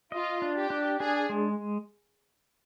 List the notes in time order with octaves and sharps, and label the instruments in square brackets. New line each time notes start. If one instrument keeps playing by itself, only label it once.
[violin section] F4 [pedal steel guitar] D#5
[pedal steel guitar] D4
[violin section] G4
[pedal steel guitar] D4
[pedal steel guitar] D4 [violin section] G#4
[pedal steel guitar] G#3